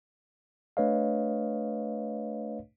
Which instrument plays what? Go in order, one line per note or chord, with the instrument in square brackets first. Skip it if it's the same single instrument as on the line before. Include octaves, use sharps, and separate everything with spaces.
[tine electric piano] A3 D4 B4 C#5 D#5 F5